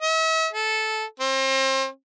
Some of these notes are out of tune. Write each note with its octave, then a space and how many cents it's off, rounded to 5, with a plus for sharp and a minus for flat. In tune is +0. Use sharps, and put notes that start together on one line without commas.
E5 -40
A4 -10
C4 +35